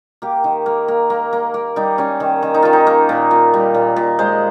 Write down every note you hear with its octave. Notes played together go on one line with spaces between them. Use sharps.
A#3 G4
D#3
A#3
A#3
A#3
A#3
A#3
G3 D#4
G3 C#4
D#3
D#3
D#4
D#3 F4
D#4
A#3
A#2
A#2
G3
A#2
A#2
G#3 C5